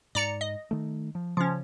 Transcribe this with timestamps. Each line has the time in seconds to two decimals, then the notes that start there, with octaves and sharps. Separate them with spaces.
0.15 G#2 D5 A#5 C#7
0.41 D#5
0.71 D#3 A3
1.15 F3
1.37 C#3 F3 C#4